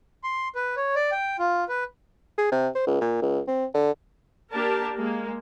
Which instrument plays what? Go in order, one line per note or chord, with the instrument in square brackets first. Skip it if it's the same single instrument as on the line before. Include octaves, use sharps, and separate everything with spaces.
[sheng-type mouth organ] C6
B4
C#5
D5
G5
F4
B4
[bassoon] G#4
C3
C5
C#2
A#2
C#2
C4
D3
[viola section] A#3 D4 G4 A#4 A5
G#3 A#3